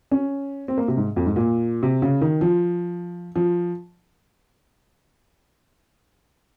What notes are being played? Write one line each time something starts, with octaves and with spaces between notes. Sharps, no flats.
C#4
C4
A#3
C3
G#2
F2
G#2
A#2
C3
C#3
D#3
F3
F3